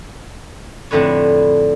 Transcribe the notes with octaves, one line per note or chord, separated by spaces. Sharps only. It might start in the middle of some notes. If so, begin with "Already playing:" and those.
F2 A2 D3 B4 C#5